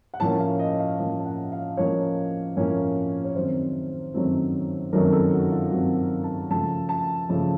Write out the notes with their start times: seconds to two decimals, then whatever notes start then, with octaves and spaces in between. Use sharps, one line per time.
0.14 F#5
0.20 A2 F3 A#3 C#4 A5
0.40 F5
0.59 D#5
0.80 F5
0.99 A2 F3 A#3 C#4 D#5
1.20 A5
1.25 F#5
1.52 F5
1.77 A2 F3 A#3 C#4 C#5
2.57 A2 F3 A#3 C#4
3.24 C#5
3.35 F#2 D#3 F#3 A3 C4 C5
4.14 F#2 D#3 F#3 A3 C4
4.93 F#2 D#3 F#3 A3 C4 A#4
5.12 A4
5.33 F#4
5.51 F4
5.71 F#2 D#3 F#3 A3 C4 F#4
5.97 F5
6.24 A5
6.50 C#3 F3 A3 A5
6.89 A5
7.29 C#3 F3 A3